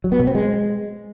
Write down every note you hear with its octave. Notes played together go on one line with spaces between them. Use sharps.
F#3
B3
B2
C4
G#3